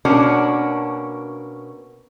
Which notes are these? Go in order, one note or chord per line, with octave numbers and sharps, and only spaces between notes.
B2 A#3 C#4 D4 F#4 A#4